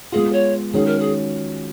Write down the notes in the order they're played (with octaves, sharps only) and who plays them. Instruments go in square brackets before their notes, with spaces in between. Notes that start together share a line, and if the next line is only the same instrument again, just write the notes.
[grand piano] G#3 B3 F4 [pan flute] G#4
[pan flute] C#5
[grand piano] D#3 G#3 C#4 F#4 [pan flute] G#4
[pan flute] A#4
G#4